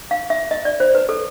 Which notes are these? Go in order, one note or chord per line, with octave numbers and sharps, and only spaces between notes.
F5
E5
D#5
D5
C5
B4
A4